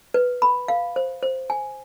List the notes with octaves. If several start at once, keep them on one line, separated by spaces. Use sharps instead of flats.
B4
B5
F5
C5
C5
G#5